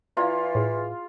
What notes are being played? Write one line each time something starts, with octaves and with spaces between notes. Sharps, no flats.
E3 E4 F4 D5 F5
A2 G#4